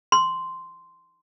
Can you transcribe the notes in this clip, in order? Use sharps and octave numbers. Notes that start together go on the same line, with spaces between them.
C6